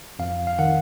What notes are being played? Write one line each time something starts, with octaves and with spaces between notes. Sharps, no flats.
F2 F5
F5
D#3 F#5